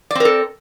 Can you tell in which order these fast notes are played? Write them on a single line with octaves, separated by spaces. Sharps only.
D5 C4 A#4 A4